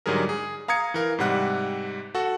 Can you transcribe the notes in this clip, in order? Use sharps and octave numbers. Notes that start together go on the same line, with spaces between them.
G#2 D3 F#3 G3 G#4 A#4
G#4
F5 A#5 D#6 G#6 C#7
E3 A#4 F5
G#2 C3 G3 F#5 F#6
F#4 A4 F#5